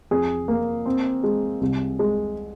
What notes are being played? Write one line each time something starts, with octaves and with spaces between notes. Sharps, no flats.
F2 G#4
A#3
C4
G#3
C2
G#3